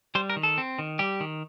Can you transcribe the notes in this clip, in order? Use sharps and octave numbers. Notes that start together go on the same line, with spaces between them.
G3 C5
A#4
D#3
A4
C4
D#3
G3 G4
D#3